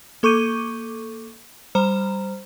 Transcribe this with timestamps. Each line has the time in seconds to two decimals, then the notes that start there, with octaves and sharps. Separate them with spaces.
0.23 A#3 A4 C#6 D6 G6 D#7
1.75 G3 C5 A#5